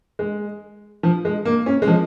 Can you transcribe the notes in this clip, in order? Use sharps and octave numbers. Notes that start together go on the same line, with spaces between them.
G#3
F3
G#3
A#3
C#4
G#3
F3